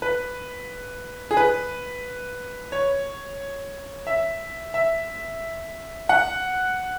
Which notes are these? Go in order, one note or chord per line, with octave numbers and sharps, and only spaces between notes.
B4
G#4
B4
C#5
E5
E5
F#5